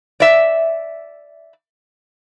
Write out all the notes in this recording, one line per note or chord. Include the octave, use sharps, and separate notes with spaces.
D5 E5